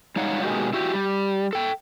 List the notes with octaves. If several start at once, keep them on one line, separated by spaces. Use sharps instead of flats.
G3 G#3 D#4 C#5 F5 F#5
B2 G#3 A#3 D#4 F#4 G4
E4 F#4 G4
G3
A4 G5